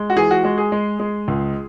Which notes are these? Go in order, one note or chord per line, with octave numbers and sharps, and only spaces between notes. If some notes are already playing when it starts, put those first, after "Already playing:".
Already playing: G#3
F#4
E3 G#4
F#4
G#3 F#4
G#4
G#3
G#3
C#2